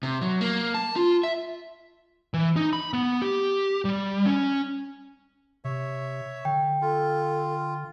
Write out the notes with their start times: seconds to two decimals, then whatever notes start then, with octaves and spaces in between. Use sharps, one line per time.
0.03 C3
0.21 F#3
0.41 A#3
0.74 A5
0.96 F4
1.23 E5
2.34 E3
2.56 D#4
2.73 B5
2.93 B3
3.22 G4
3.85 G3
4.26 C#4
5.64 C3 C#5 E5
6.45 D3 G5
6.81 F4 A4